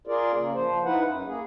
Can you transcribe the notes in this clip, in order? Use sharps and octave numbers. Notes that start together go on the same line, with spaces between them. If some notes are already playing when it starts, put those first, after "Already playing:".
F4 G#4 A#4 D5
C#3 A#3
F3 C5
D#4 E4 B4 F#5
F#2
A#3 G#4